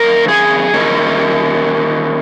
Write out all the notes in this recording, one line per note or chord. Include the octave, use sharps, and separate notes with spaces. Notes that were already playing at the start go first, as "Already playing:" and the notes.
Already playing: D#3 F#3 A#3 C#4 A#4
G#4
D#3 A#3 C#4